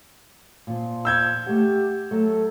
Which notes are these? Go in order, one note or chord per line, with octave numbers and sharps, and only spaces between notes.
A#2 F3
E6 G6 G#6
A3 G4 F#5
F#3 A3 A4